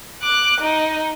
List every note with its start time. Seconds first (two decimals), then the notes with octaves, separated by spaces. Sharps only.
0.22 D6 F#6
0.61 D#4